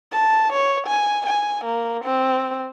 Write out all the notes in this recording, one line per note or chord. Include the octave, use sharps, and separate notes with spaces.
A5
C#5
G#5
G#5
A#3
C4